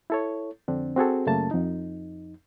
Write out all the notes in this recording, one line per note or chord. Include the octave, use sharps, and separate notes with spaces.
E4 A4 C#5
F2 D3 C4 D4
C4 F#4 G#4 A4
F#2 C#3 A3 A#3 A5
F2 D#4